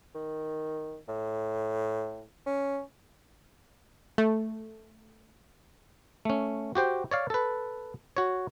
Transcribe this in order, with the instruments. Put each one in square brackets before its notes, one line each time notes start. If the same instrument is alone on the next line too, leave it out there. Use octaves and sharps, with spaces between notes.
[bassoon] D#3
A2
C#4
[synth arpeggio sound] A3
[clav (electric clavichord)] A3 C#4
F#4 G4 C5 G5
C#5 D5 F5
A4 B4
F#4 C#5